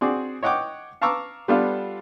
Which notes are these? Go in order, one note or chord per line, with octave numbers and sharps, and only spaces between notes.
C4 F#4 G#4 D5
C#5 D#5 F#5 G5 D6
F5 A5 A#5 C#6 D6 E6
G3 B3 D4 F4 A4 F5